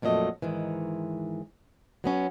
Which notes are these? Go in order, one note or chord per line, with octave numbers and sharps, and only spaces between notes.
F2 A#2 F#3 A3 D#5
G#2 D#3 E3
F#3 B3 C#4